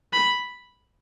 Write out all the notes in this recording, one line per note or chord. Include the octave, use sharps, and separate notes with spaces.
B5